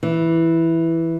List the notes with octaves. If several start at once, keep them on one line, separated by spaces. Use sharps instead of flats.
E3